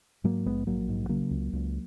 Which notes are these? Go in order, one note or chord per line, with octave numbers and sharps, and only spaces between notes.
G#2 F#3 A#3
A#1 G#3 B3
A#1 F#3 A#3
G#2
C#3 F#3 A#3
C#2
C#2